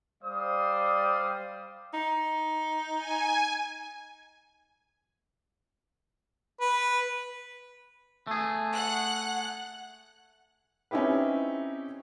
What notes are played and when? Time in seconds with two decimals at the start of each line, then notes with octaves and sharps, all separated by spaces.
0.24 G3 C5 D5 F5 D#6
1.94 D#4
2.95 G#5
6.61 B4
8.27 A3 G#4
8.74 F#5 F#6
10.91 C4 C#4 D#4 E4 G4 B4